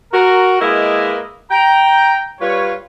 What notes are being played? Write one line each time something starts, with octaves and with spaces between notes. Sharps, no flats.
F#4 A#4
G#3 A#3 E4 A#4 B4 D#5
G5 A#5
G3 F4 B4 C#5